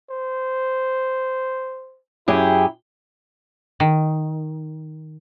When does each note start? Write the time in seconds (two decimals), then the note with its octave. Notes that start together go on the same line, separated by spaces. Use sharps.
0.10 C5
2.28 F#2 E4 G4 G#4
3.80 D#3